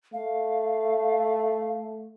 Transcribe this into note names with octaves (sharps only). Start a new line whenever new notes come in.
A3 F5